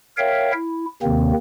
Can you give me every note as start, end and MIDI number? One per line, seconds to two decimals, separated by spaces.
0.18 0.52 70
0.18 0.52 73
0.18 0.52 76
0.18 0.52 77
0.18 0.52 79
0.52 0.85 64
1.03 1.33 39
1.03 1.33 48
1.03 1.33 51
1.03 1.33 58
1.03 1.33 60